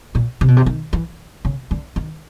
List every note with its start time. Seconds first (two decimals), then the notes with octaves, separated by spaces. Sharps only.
0.15 A#2
0.41 C3
0.48 B2
0.57 C3
0.66 D#3
0.93 E3
1.45 C#3
1.71 D3
1.96 D#3